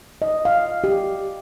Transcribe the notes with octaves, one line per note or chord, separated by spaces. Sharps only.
D#5
F5
G4